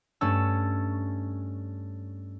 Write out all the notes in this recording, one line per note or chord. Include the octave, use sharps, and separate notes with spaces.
G2 A3 C#4 A5 E6